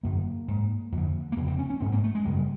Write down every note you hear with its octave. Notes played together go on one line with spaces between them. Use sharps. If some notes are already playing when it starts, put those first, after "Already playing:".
F#2 D3 A#3
G#2
F2 D3
A#3
F2 C#3 B3
C4
C#4
C#4
G#2 C4
A#3
A3
G#3
F#2 C#3 G3
G3